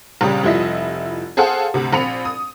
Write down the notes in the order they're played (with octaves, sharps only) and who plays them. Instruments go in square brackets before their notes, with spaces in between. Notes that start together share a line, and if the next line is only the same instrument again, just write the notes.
[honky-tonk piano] A#1 C#3 G3 G4 A#5
F1 F3 G3 E4 D#5 B6
G#4 A4 C5 F5 F#5 A5
D2 C3
A#1 C4 B5 C#7 F7
D#6